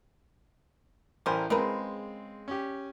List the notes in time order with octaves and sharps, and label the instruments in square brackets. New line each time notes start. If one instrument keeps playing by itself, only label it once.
[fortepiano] A1 A#4 G#5 [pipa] G3 C5
[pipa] C#3 A#4 B4 [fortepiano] G#3 C4
[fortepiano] C#4 G4